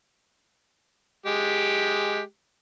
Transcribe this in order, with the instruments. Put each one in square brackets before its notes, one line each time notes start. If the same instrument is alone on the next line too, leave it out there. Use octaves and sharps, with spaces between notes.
[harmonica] G#3 G4